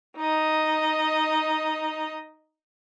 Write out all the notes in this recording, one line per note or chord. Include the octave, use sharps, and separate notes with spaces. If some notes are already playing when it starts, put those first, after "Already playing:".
D#4 D#5